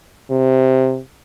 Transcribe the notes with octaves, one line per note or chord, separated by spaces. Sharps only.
C3